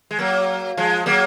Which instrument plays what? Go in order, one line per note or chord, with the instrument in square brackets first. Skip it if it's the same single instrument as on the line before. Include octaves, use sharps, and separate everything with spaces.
[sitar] G#3
F#3 A#3
F3 G#3
F#3 A#3